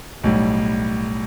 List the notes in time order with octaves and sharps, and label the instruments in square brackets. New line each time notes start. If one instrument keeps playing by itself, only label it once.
[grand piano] B1 A2 G3